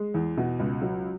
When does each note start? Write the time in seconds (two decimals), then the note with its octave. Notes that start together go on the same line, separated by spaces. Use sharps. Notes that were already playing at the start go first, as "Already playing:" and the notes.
Already playing: G#3
0.14 E2
0.37 B2
0.59 C#2
0.82 F#3